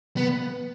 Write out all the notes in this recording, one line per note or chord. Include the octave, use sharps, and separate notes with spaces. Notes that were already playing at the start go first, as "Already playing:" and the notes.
B3